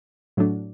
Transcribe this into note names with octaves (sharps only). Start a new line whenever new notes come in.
A2 F#3 A3 D4